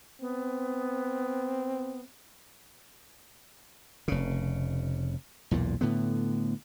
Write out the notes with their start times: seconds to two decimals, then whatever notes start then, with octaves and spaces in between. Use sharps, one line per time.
0.21 B3 C4
4.08 F1 C#3
5.51 B1 E2 A#2
5.81 A2 D3 B3